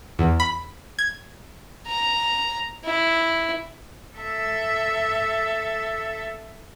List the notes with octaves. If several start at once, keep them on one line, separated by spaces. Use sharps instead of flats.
E2
B5
G#6
A#5
E4
A4 E5